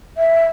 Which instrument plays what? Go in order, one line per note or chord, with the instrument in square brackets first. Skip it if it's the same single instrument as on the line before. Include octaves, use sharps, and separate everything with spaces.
[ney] E5